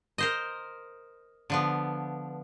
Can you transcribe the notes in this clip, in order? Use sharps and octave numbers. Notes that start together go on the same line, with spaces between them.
A#4 C5 D#5
D3 F3 B3